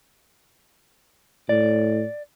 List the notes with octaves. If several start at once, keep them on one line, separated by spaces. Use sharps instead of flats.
A2 D5